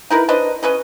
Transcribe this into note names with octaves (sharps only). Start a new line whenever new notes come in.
D#4 E4 A#4 B4
D4 B4 C5 D#5
C#4 B4 D#5